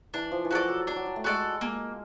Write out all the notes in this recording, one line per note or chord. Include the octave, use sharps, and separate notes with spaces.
E3 D4
F3
E3
F3 F#4 A4 D5
F#3
G3 D4
F#3
G3
A3
G#3 F#4 A4 D5
G#3 A#3